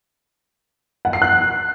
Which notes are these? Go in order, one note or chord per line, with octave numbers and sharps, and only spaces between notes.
F#5
C7
F#6